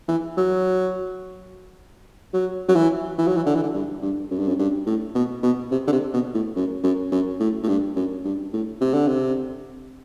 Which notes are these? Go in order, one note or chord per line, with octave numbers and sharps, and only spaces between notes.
E3
F#3
F#3
F#3
E3
E3
F#3
E3
D3
E3
D3
G2
G2
F#2
G2
F#2
G2
A2
B2
B2
C3
D3
C3
B2
A2
F#2
F#2
F#2
A2
A2
G2
F#2
G2
A2
C3
D3
C3